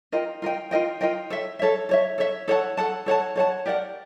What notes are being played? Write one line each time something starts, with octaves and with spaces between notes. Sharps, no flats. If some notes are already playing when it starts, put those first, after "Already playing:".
F4 A#4 D#5 G5
F4 A#4 D#5 G5
F4 A#4 D#5 G5
F4 A#4 D#5 G5
A4 C#5 E5
A4 C#5 E5
A4 C#5 E5
A4 C#5 E5
A4 C#5 F#5 A5
A4 C#5 F#5 A5
A4 C#5 F#5 A5
A4 C#5 F#5 A5
G4 A#4 D5 F#5